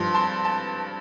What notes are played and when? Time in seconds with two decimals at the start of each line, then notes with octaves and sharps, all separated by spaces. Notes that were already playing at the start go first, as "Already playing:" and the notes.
Already playing: G2 F3 C6
0.14 A5 C6
0.45 A5